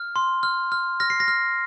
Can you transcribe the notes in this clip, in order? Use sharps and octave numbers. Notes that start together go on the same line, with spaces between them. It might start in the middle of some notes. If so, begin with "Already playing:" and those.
Already playing: F6
C6
F6
F6
F6 A#6
C7
A#6
F6